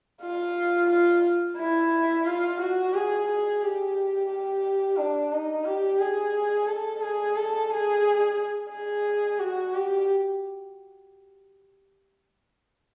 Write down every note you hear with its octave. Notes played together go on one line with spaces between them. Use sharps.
F4
F4
E4
F4
F#4
G#4
G#4
G4
G4
D4
D#4
G4
G#4
A4
G#4
A4
G#4
G#4
F#4
G4